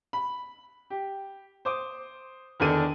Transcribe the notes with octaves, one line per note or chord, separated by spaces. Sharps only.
B5
G4
C5 D6 D#6
E2 D3 D#3 D4 A4 D#7